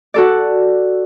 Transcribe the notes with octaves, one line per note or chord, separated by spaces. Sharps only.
F#4 A4 D5